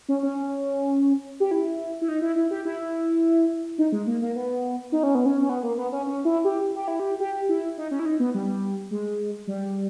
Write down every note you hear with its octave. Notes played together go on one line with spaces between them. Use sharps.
C#4
C#4
G4
E4
E4
D#4
E4
E4
G4
E4
D#4
G#3
A#3
A#3
B3
D#4
C#4
B3
C#4
C#4
B3
A#3
B3
C#4
C#4
E4
G4
G4
E4
G4
G4
E4
D#4
C#4
E4
D#4
B3
G3
G#3
G3